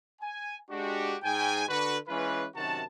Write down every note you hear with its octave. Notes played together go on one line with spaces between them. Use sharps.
G#5
G#3 D4 F#4 G4
G#2 G5 G#5
D3 F#4 B4
E3 G#3 C#4 F4 B4
F#2 C3 D#3 F#4 A5